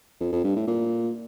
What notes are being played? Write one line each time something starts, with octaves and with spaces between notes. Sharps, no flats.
F2
F2
G2
A2
A#2